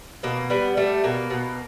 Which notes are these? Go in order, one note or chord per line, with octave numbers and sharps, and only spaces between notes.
B2 A#3
G3 B3
G3 A3
B2 A#3
B2